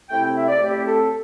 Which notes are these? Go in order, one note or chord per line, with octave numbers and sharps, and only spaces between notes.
C3 A3 C4 E4 G5
G5
E5
D5
A2 A3 C4 E4 G4
A4